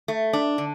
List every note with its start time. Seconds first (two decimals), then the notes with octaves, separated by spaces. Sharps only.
0.08 A3
0.33 D4
0.58 D3